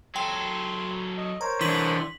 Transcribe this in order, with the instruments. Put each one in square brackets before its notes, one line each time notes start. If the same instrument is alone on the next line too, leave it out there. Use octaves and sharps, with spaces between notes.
[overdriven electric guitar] F#3 A4 [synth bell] G5 [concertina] C6
[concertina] D#5
[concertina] A#4 C5 C#5 [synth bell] A#5
[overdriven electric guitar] D3 [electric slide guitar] E3 D4 [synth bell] C6 B6 F#7